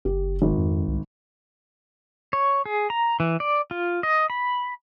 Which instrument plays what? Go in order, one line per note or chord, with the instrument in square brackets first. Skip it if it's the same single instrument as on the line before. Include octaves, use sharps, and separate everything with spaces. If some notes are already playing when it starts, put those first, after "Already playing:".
[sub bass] F#1 [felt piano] G4
[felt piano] G#1
[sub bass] F2
C2
[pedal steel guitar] C#5
G#4
A#5
E3
D5
F4
D#5
B5